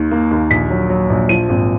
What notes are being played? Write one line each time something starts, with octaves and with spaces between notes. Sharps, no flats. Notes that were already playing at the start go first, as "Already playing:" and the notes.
Already playing: D#2 D#3
A#3
D#2
A#1 B6
F#3
F#3
A#1
F3 D#7
G#1